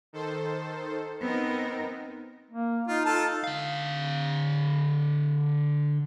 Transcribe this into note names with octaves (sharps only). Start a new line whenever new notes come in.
D#3 A4 C5
B3 C4 D#4 A#4
A#3
D#4 F4
F4 A4 A5
D3 F5